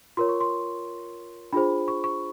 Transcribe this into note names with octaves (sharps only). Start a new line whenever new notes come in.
F4 A#4 C#5 C6
C#6
C6
D4 F4 G#4 C5 B5
C#6
C#6